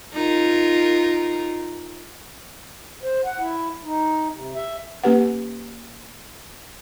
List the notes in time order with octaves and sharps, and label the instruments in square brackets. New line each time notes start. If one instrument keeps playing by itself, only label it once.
[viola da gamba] D#4 F4 A#4
[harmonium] C5
F#5
E4
D#4
C3
E5
[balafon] A#3 C#4 G4 B4 F#5